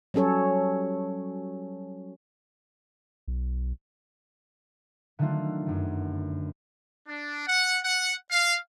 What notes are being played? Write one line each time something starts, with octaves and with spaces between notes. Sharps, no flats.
F#3 G3 C#4 A4 C#5
B1
D3 D#3 F#3 A3 F4
G1 F#2
D4
F#5
F#5
F5